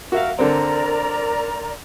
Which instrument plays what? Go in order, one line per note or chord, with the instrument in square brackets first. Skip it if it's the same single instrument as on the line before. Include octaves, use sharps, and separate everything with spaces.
[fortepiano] F#4 E5 F5 [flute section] A#4
[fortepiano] D3 C4 [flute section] A#4 D5 A#5